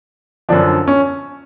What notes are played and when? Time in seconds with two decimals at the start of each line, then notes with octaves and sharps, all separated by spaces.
0.49 F#2 D3 F3 D4
0.88 C#4